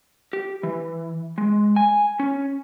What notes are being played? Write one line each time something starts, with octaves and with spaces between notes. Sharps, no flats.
G4
E3
G#3
G#5
C#4